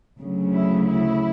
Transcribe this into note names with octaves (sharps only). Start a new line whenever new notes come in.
D2 C#3 F#3
E4
E4